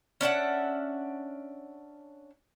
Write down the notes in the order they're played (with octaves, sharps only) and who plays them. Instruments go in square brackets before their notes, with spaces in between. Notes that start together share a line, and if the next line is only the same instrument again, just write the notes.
[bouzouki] C#4 D4 E5 F#5